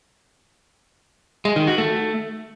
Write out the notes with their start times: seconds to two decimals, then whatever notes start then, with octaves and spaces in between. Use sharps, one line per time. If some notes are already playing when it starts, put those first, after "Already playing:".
1.45 G#3
1.56 D#3
1.67 F#4
1.78 A3